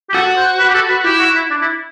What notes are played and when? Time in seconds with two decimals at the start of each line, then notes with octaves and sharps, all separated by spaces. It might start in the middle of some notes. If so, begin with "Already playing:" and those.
0.09 G4
0.14 F#4 A4
0.37 C5
0.59 B4
0.69 G4
0.74 A4
0.89 B4
1.04 E4 G4
1.19 F#4
1.35 E4
1.50 D4
1.62 E4